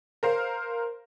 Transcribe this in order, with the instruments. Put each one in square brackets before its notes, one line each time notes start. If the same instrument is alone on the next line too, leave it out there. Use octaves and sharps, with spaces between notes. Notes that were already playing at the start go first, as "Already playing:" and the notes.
[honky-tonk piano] A#4 C5 F5